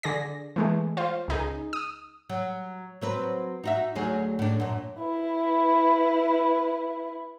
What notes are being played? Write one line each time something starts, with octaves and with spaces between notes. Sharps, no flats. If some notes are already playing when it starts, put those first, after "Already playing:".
D3 G#4 D5 A#6
E3 G#3 A3
F4 C5
C#2 D#4 G#4
D#6
F#3
F#3 C4 B4
D#4 F#4 E5
D2 F#3 G#4
A2 D4
F#2 A#2
E4 B4